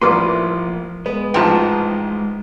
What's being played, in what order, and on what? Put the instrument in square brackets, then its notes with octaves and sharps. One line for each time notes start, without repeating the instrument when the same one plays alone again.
[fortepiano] A1 G3 B4 [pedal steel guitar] F3 C6 [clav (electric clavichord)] A#3 E4
[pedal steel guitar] G#3 [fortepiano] B3 [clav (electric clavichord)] B4
[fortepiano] A1 F3 G5 [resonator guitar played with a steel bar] G#2 A5